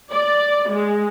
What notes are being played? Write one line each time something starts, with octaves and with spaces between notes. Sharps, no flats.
D5
G#3